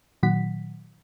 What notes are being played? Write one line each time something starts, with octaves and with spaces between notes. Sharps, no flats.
A#2 D#3 F#3 F#5 B6